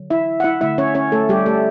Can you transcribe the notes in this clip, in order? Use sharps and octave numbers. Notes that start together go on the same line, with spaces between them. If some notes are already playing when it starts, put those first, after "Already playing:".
Already playing: D3 F#3
E4 E5
F#5
E4 E5
D3 A3 E4 E5
C#4 C#5
C#4 C#5
A3 A4
G3 G4
A3 A4